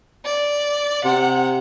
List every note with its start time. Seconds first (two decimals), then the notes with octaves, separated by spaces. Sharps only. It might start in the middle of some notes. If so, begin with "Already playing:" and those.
0.25 D5
1.04 C3 F#5